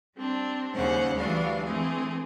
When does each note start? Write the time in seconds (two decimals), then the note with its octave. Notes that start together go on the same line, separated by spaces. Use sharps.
0.16 G3 C4 D4
0.74 D#2 C#3 G3 C#4 C5 F#5
1.16 D2 E3 G3 D4 F#4 F5
1.65 E3 A3 C4 G#4